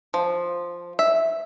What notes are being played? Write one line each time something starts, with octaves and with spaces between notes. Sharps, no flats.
F3
E5